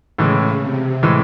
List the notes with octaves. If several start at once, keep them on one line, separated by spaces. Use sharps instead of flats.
A2 C#3 E3 G#3
C3
A2 E3 G#3